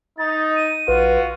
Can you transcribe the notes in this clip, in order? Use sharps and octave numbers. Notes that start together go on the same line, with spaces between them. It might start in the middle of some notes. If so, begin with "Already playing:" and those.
D#4 A6
D#7
A#1 F4 F#4 B4